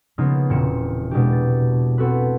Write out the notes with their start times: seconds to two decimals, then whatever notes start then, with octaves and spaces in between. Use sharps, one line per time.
0.18 C#3 F3 A#3 B3 D#4 F4
0.50 E1 A#2 C4 C#7 E7
1.11 B2 G#3 D4 G4
1.32 A6
1.98 B3 C4 F#4 A4 B4